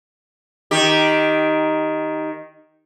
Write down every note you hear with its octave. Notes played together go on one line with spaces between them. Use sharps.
D#3 G4